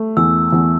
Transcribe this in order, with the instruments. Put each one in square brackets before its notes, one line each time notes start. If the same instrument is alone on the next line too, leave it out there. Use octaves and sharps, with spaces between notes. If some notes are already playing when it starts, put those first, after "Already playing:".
Already playing: [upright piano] A3
[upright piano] E2 [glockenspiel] E6
[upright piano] E2